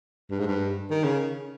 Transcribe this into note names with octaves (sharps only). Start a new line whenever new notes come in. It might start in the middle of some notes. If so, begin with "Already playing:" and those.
G2
G#2
G2
D#3
C#3